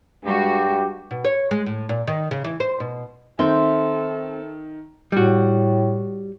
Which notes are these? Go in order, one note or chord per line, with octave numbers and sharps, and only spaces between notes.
G2 G3 G#3 F#4 G4
B2
C#5
G#3
A2
A#2
D#3
C#3
E3
C5
B2
D#3 C4 A4 E5 C6 G6
A2 G3 F#4